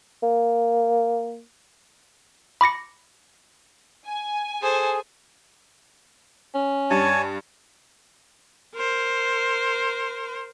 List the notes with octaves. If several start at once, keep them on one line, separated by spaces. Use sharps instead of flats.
A#3
B5 D6 A#6 C#7
G#5
G#4 A4 C5
C#4
G2 C#5 G#5 A5
A#4 C5